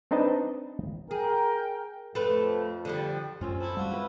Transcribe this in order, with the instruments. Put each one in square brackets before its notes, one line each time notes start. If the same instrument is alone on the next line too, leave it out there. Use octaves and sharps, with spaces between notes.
[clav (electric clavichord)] C4 D4 D#4 B4 D#5 A5
[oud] G#4 [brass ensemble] A#4 G5
[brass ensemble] F2 [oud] A3 B4
[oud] D3 F3 G3
[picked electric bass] F#2 [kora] C4 C#4 F4
[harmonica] E4 A4 [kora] C5
[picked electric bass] G3 G#3 [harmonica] F4 F#4
[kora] E4 B4